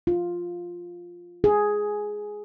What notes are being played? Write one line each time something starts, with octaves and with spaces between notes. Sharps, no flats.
F4
G#4